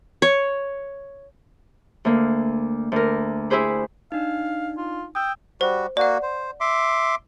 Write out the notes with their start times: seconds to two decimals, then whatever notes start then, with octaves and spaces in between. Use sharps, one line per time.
0.22 C#5
2.05 D2 A#3
2.92 D2 A#4
3.50 E4 G4 G#4 C5 B5
4.12 D4 D#4 F5
4.77 F4
5.15 G5 D#6 E6
5.61 G3 F#4 C5
5.97 A#3 F#4 D5 F#5
6.22 C5
6.60 E5 C6 D6